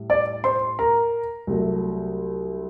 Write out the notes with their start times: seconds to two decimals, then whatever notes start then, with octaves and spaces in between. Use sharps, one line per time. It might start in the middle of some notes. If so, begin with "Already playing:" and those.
Already playing: A2 G3
0.10 D5 D6
0.44 C5 C6
0.79 A#4 A#5
1.47 C2 C3 F#3 A3